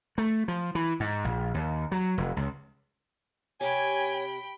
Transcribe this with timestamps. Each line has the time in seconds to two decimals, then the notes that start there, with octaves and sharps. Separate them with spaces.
0.18 A3
0.48 F3
0.75 E3
1.00 G#2
1.24 A#1
1.54 D#2
1.92 F#3
2.18 F1
2.37 C#2
3.61 C3 G4 C#5 G5 G#5 B5